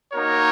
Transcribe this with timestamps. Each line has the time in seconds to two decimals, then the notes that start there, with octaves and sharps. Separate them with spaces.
0.13 A#3 D#4 F#4 A#4 C#5